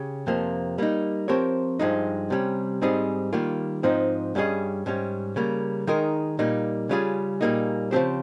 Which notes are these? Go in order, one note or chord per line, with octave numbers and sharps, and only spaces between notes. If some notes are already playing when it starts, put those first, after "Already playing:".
Already playing: C#3 C#4 G4
F2 C3 F3 A#3
G3 A#3 D#4
F3 C4 G4 A#4 C#5
G2 F3 G#3 D#4
C3 G3 C#4
G#2 G3 C4 D#4 G#4
D#3 G3 A#3 F4
G#2 F3 C4 D#4
G2 G3 C#4 G#4 D#5
G#2 G3 C#4
C#3 G3 A#3
D#3 G#3 D#4 A#4
A#2 G3 A#3 D#4
C#3 G3 C#4 F4 G#4
A#2 G3 A#3 D#4 G#4
C#3 F3 C4 G4 C5